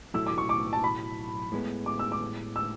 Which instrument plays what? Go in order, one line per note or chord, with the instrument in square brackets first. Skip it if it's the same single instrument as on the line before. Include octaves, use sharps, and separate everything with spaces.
[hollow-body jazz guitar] B1 A2 F#3 A3 E4 [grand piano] E6
[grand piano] D6
C#6
D6
A5
B5
[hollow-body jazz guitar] A2 G#3 B3
[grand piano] D6
E6
D6
E6